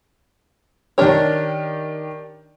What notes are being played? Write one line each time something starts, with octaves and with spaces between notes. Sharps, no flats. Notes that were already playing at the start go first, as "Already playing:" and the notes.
D#3 D4 G4 A#4 C#5